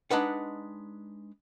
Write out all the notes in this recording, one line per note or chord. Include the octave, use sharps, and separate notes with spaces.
G#3 D4 D#4 B4 F#5